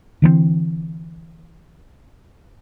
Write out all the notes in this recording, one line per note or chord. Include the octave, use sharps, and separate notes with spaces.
D3 E3 G#3 C4